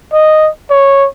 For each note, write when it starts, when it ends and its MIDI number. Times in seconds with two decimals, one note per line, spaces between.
0.13 0.50 75
0.70 1.08 73